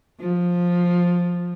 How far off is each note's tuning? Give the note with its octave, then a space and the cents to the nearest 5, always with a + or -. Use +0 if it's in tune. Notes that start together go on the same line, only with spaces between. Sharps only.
F3 +10